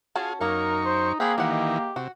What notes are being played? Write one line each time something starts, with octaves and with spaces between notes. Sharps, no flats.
C#4 F4 F#4 G#4 A5
F#2 A#3 C#4 D#4 A#4 C#6
C5
A#3 C4 G4 G#4 F#5 B5
D#3 E3 G#3 G4 F#5
C3 F#4